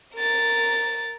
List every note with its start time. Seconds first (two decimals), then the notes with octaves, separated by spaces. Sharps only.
0.14 A#4 A6